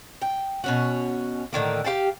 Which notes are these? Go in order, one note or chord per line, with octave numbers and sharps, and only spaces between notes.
G5
B2 C#4 F#4
A2 D3 D#3 A#3
G4 F5 G5 A5